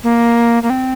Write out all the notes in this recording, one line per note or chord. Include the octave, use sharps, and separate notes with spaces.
A#3
A#3
C4